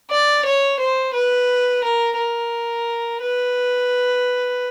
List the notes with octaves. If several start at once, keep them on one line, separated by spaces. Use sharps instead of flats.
D5
C#5
C5
B4
A#4
A#4
B4